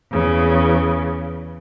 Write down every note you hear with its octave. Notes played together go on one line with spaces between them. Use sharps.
E2 C#3